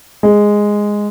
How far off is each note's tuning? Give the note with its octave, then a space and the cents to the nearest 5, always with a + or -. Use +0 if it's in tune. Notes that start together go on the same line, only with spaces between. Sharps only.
G#3 -5